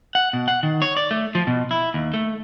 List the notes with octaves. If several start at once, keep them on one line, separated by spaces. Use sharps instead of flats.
F#5
B2
F#5
D#3
C#5
D5
A3
F3
B2
E4
D#2
A3